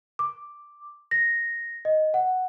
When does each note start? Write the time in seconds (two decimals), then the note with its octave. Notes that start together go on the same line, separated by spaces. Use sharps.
0.19 D6
1.11 A#6
1.85 D#5
2.14 F#5